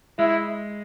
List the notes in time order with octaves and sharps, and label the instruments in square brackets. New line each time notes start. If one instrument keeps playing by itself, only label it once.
[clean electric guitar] G#3 [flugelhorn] E4